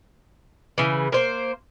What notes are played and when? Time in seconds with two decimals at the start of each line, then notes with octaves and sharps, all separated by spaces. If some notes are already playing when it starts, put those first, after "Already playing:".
0.78 C#3 E3
1.12 A#3 C5